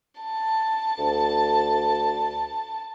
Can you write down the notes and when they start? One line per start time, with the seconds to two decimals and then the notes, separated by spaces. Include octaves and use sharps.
0.21 A5
0.98 D2